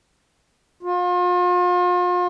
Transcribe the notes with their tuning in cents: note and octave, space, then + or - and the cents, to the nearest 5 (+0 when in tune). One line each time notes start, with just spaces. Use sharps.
F4 +40